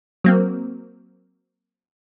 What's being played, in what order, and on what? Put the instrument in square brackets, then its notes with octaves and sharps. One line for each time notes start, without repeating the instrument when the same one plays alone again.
[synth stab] F#3 A#3 C4